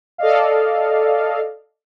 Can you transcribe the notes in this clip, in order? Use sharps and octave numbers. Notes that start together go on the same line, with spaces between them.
A4 D5 D#5 F5